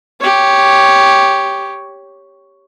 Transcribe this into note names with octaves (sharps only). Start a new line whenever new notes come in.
G4 C#5